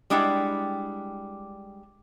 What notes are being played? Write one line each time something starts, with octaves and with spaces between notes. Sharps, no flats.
G3 G#3 D4 E4 F#5 G5